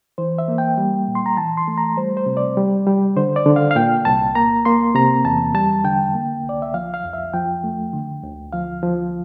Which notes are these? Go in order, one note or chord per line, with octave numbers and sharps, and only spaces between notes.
E3 C5
E5
A#3
G5
G3
A#2
C6
A#5
E3 A5
C6
A3
A#5
G3 C5
C5
C3
D5
G3
G3
D3 C5
D5
D3
F5
F5
A#2 G5
C2 A5
A#3 A#5
A#3 C6
C3 A#5
E2 A5
G3 A5
D3 G5
A#3
C2
D5
E5
F3 F5
F5
F2
E5
F3 G5
A3
D3
D2
F3 F5
F3